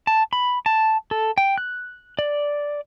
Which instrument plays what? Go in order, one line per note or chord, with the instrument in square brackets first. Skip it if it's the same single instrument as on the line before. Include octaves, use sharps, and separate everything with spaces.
[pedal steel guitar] A5
B5
A5
A4
G5
F#6
D5